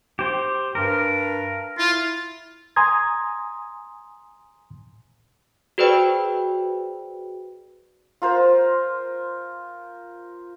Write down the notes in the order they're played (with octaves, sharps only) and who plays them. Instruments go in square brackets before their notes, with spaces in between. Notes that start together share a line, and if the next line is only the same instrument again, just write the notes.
[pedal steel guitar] G4 C5
[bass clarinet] G2 [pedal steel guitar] A#4
[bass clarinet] E4 [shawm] F4
[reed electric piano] G#5 A#5 C6 D#6 G#6
[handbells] F#4 G#4 B4 C5 D5 G5
[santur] F4 A#4 C5